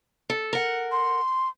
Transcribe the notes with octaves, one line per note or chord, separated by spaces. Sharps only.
A4
A#4 F#5
C6